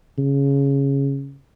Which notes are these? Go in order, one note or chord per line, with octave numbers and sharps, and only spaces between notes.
C#3